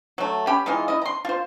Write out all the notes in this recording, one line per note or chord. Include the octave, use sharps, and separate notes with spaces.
F#3 A3
C#4 G4 B5
E3 G#3 D#4 F4
E4 D#5
A#5 C6
F4 C5